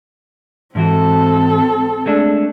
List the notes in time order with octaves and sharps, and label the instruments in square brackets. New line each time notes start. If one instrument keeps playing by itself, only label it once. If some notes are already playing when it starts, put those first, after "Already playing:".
[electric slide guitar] G#2 E3 F#4 [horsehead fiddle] C4 A4
[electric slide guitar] G#3 A3 D4